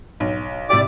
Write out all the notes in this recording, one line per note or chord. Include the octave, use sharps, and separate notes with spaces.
B1
C3 E4 G4 D5 D6